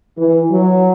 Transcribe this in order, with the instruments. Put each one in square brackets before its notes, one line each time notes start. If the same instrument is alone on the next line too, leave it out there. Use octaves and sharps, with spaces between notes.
[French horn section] E3
F#3